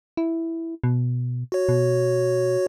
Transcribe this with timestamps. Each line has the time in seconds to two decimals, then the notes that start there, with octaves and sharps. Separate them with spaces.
0.17 E4
0.84 B2
1.52 F#4 C#5
1.69 B2